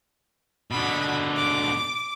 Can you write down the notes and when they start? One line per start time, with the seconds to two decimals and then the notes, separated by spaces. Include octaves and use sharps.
0.71 B2 D3 F#4 B5
1.37 D6